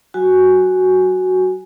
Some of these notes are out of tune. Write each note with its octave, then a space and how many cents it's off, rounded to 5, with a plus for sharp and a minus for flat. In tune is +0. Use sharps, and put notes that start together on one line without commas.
F#3 +10 F#4 +0 G#5 +0